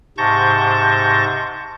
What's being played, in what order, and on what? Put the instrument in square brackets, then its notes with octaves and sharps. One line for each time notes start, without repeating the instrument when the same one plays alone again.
[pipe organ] G#2 C3 A5 C#6 G6 A#6